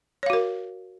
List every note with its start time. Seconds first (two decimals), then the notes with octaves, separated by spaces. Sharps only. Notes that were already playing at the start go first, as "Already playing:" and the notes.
0.23 C#5
0.26 F5
0.30 F#4
0.33 A#4